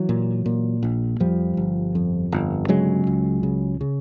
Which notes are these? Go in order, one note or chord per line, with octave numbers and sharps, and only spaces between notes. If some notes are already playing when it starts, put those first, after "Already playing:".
Already playing: E3 F#3
A#2
A#2
A#1
F2 F3 G3
G1
F2
G1
C#3 F#3 G#3
C#2
C#3
C#3